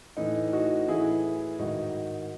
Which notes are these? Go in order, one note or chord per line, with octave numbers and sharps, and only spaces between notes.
A2 E3 D#4
D#4 F#4
A2 E3 E4 G#4
G#2 D#3 D#4 F#4